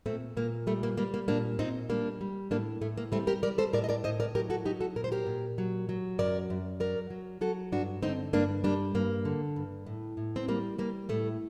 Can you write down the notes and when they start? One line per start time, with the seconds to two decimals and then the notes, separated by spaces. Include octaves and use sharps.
0.06 A#2 A3 C4
0.37 A#2 A#3
0.67 G3 A3
0.83 A#3
0.97 G3 A#3
1.14 A#3
1.28 A#2 A#3 D4
1.59 A#2 C4 D#4
1.89 G3 A#3 D4
2.21 G3
2.51 A2 A#3 D4
2.81 A2 A3
2.97 A#3
3.12 G3 A3 C4
3.27 G4 A#4
3.43 G3 A#4 D5
3.58 A4 C5
3.73 A2 A#4 D5
3.84 D#5
3.89 A#4 D5
4.04 A2 C5 D#5
4.20 A#4 D5
4.35 F#3 G4 A#4
4.50 F#4 A4
4.65 F#3 D#4 G4
4.80 F#4 A4
4.96 A#2 A#4
5.04 C5
5.12 G4 A#4
5.27 A#2
5.58 F#3
5.89 F#3
6.18 F#2 A#4 D5
6.50 F#2
6.80 F#3 A#4 D5
7.10 F#3
7.41 F#3 F#4 A4
7.72 G2 D4 F#4
8.02 D3 C4 D#4
8.33 G2 A#3 D4
8.64 G3 A#3 D4
8.95 G2 A#3
9.25 D3
9.56 G2
9.86 A2
10.17 A2
10.36 C4
10.48 G3 A#3
10.78 G3 A#3
11.09 A2 A3